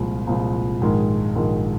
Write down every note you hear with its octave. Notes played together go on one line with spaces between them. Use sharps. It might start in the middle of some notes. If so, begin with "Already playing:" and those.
Already playing: C2 A#2 F3 G#3
C2 A#2 F3 G#3
A#1 G#2 D#3 G#3
A#1 G#2 D#3 G#3